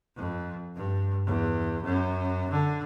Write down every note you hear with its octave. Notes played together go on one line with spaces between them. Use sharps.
F2
G2
E2
F#2
D3